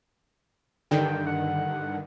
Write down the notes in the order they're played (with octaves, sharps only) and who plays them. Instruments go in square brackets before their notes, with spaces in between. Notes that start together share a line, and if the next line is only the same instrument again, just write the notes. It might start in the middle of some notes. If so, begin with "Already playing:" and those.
[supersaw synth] G2 D3 D#3 [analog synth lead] G5
[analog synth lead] F#5